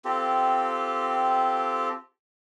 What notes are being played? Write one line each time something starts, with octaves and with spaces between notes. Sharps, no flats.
C4 F4 G4 A4